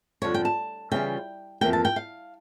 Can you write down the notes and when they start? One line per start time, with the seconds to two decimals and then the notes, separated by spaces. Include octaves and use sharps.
0.22 F2 D3 G3 C#5
0.34 G5
0.45 A5
0.91 C#3 E3 G3 C#4 F4 G5
1.61 F2 E3 A#3 G5
1.73 A5
1.85 G5
1.96 F5